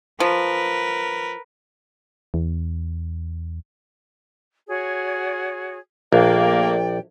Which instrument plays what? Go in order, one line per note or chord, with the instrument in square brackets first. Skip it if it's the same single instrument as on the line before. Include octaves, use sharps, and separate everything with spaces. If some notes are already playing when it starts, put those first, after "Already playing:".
[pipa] F3 [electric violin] A#4 B4
[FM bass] E2
[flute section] F#4 G#4 C#5
[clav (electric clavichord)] A#1 [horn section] A3 A#3 [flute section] D5 G5